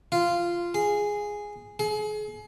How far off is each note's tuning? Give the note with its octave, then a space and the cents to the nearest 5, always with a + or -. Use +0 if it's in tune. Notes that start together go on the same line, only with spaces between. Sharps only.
F4 -10
G#4 -5
G#4 +35